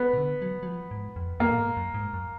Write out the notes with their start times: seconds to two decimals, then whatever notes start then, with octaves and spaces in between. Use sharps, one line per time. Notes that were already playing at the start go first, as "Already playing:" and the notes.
Already playing: B3
0.13 B2
0.17 D3
0.42 F#3
0.63 F#3
0.66 F3
0.91 G#2
1.16 F2
1.40 F#2 A#3
1.51 A#2
1.58 G#2
1.77 F#2
1.94 G#2
2.14 F#2